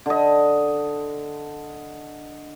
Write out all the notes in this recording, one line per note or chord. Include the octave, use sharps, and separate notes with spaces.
D3 D#5